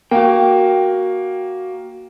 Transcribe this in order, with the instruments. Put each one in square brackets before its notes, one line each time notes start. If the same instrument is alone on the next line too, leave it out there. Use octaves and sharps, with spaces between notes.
[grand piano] A#3 [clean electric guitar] F#4 G5